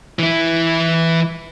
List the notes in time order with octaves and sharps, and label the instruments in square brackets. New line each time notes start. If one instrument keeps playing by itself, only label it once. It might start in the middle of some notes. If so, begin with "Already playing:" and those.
[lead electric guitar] E3 E4